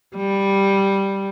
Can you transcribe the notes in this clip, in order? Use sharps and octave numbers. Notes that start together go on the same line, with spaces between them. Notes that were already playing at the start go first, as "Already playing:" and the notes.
G3